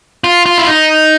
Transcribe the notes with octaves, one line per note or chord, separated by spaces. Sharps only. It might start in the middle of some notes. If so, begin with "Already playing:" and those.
F4
F4
E4
D#4